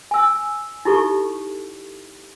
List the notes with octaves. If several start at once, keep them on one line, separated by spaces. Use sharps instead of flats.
G#5 E6
D#4 E4 G4 A4 C#6